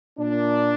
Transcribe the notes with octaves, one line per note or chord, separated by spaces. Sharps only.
A#2 D4